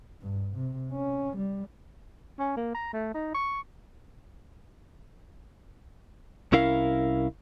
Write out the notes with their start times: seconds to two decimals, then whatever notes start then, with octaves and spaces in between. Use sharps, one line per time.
0.21 G2
0.55 C3
0.92 C#4
1.37 G3
2.39 C#4
2.57 A#3
2.74 A#5
2.93 A3
3.14 D#4
3.34 C#6
6.52 C2 C#4 E4 A#4 F5